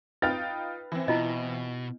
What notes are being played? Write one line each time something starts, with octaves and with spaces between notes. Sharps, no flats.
D#4 F4 B4 G5 F6 A6
E3 C4
B2 E4 F4 D#5